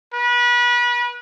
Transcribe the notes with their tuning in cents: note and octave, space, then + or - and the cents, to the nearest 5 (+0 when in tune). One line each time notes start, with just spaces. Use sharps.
B4 -30